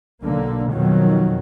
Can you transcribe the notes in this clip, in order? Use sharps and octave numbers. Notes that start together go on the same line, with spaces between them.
B1 D3 A#3
F2 B2 D#3 F#3